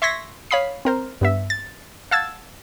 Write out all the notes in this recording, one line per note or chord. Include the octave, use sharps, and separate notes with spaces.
E5 C6 C#6 G#6 A#6 B6
C#5 F5 B5 D#6 C7
C4 A#4 C5
G2 B3 E5
A6
F5 F#5 A5 E6 G#6 A6